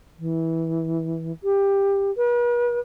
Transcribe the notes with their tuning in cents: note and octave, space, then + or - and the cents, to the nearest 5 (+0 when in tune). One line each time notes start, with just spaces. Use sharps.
E3 -15
G4 +15
B4 -40